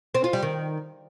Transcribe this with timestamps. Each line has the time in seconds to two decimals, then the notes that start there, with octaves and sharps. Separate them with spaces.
0.15 C4
0.24 F4
0.33 G3
0.42 D#3